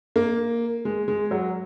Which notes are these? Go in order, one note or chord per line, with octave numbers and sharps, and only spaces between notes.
A#3
G#3
G#3
F#3